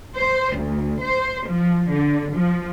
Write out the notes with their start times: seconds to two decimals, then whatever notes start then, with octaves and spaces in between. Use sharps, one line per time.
0.16 C5
0.56 D2
1.03 C5
1.48 F3
1.90 D3
2.35 F3